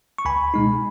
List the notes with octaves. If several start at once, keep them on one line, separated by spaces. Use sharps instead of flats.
C#6
C#2 G#5 B5
B2 G#3 D#4